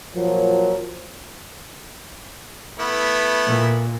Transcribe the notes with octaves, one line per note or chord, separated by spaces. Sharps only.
A#2 F3 F#3 A#3
A3 B3 E4
A#2